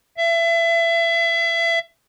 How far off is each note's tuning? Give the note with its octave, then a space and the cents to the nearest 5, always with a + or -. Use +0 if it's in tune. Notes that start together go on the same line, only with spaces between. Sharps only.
E5 +30